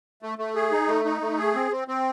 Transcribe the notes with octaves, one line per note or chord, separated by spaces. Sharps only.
A3
A3
G#4
D#4
A3
D#4
A3
G#4
C4
C4
C4